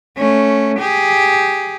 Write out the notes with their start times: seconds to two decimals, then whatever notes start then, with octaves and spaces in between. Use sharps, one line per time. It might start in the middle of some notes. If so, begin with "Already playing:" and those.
0.18 A3 C#4
0.79 G4 G#4